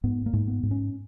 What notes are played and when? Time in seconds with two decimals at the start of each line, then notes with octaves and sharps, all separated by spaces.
0.04 G#2 B3
0.26 A#3
0.33 G#2
0.48 B3
0.63 G#2
0.71 C#4